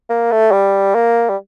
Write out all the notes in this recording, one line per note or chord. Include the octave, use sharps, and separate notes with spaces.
A#3
A3
G3
A#3
G3